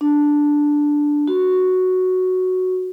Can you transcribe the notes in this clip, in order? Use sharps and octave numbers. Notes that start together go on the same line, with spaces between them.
D4
F#4